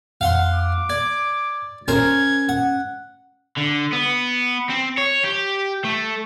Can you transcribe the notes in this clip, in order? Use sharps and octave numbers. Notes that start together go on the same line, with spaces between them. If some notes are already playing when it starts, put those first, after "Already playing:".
F2 F5 F#5 C6
D6
D5 G#6
C#4 A#4 C5 G#5 G#6
F#5
D3
B3
C4
C#5
G4
A3